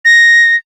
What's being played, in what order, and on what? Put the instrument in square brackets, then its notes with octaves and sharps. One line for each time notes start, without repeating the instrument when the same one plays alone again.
[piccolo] A#6